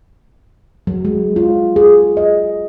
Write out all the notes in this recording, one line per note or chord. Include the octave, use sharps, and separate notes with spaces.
F#3
G#3
F4
G#4
D#5